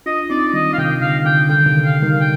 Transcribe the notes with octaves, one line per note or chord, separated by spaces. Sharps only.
D4 F4 D#5
C4 D#4 D5
D#3 G3 D#5
F5
C3 D#3 G5
D3 F5
D3 G5
D3 G5
C3 D#3
F5
D#3 G3
G5